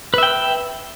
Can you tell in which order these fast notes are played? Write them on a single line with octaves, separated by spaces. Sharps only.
B4 E5 G5 E6